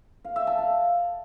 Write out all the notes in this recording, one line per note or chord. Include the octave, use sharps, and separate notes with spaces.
F5
E5
A5
F5